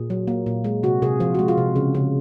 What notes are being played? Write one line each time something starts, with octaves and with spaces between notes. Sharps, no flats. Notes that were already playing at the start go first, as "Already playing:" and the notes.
Already playing: A#2 G#4
F#3
A#3
A#2
G#3
C3 F#4
C3 G#4
F3 F4
G#3 F#4
F4
C3
C#3
C#3